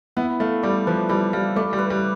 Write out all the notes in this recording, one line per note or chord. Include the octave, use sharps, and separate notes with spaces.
B3 E4
A3 F5
G3 D5
F3 B4
G3 E4
G3 F5
A3 D5
G3
B4
G3